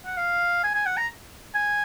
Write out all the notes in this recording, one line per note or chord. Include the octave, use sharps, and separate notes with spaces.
F#5
F5
G#5
G#5
F#5
A#5
G#5